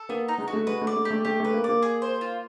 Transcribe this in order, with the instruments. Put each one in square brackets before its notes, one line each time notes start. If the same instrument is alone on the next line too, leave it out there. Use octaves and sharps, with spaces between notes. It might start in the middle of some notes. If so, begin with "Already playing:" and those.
Already playing: [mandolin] A4
[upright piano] A#3 [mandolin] B3
[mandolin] D#4
[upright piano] G#3
[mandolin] F#4
[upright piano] A3
[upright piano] G#3 [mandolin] B4
[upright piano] A3
[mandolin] D5
[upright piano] A3
[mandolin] G4
[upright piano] A3
[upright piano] A3 [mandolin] G4
[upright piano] A3 [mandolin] B4
[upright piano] A#3
[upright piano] A#3 [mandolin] D5
[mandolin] G#4
C5
F4